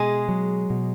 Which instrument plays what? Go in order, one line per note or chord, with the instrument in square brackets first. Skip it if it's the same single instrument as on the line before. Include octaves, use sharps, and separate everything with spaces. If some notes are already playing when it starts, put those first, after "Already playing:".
Already playing: [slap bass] B2 [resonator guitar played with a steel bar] G#3 G#4
[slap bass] F#3
B2